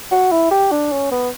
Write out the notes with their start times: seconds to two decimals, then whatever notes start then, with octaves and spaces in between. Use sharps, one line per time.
0.11 F#4
0.32 E4
0.51 G4
0.71 D4
0.92 C#4
1.11 B3